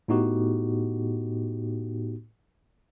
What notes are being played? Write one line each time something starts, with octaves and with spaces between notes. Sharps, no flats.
A2 B3 D#4 F#4 G4